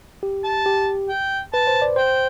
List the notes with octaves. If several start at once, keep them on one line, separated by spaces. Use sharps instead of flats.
G4
A5
G4
G5
B4 A5
C5
D5
C5 G5